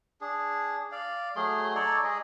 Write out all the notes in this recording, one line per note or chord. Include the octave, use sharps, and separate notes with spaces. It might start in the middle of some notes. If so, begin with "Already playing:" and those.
D4 G#4
D5 F5
F#3 A3 G#4 C6
D#4 A4 C#5 D5
G#3 G#4 D#5